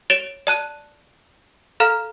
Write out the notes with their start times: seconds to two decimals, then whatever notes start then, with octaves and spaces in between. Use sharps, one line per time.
0.10 C#5 A6 D7 E7 F7 G7
0.47 D5 A5 F#6 D#7
1.80 A4 F5 A#5 F6